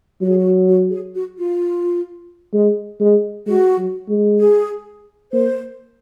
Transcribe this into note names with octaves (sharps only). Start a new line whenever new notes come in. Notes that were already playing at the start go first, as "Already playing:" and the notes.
F#3 F#4
G#4
F#4
F#4
G#4
F#4
F4
G#3
G#3
G#3 F#4
F#3
G#3
G#4
A#3 C5